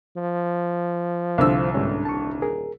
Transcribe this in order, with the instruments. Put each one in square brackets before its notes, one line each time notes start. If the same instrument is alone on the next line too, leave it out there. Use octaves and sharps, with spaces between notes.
[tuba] F3
[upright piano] C2 D3 E6 [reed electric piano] C5 F5
[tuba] G1 [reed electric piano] G#2 G3 C#4
[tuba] D#1 [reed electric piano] A5 C#6
[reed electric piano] G#4 A#4